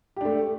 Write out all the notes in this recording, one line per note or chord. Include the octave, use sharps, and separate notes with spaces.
A3 D4 G4